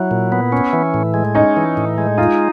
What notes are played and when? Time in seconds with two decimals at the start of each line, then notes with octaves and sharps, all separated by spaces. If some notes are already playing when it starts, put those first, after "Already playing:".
Already playing: F#3 E4
0.11 A#2
0.32 B3
0.52 C#4
0.73 E3
0.94 A2
1.14 G#3
1.35 C#4 D#4
1.57 E3
1.77 A2
1.98 G#3
2.18 D#4 F4